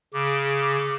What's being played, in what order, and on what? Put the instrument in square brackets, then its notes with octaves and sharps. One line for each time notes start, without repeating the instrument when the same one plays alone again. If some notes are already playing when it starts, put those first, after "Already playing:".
[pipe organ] C#3 [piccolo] D6